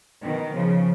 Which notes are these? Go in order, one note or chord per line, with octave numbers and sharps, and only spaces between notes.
B2 D#3
C#3 F3